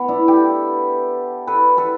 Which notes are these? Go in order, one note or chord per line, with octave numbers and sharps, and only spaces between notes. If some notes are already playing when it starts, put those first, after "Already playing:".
Already playing: B3
D4 E4
G4 A4
A4 B4
A4 B4